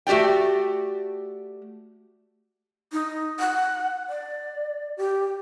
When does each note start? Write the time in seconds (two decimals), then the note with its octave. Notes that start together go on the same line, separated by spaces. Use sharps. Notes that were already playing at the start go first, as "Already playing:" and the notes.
0.07 A3 F#4 G4 D5 G5
2.92 D#4
3.40 F#5
4.09 D5
4.97 G4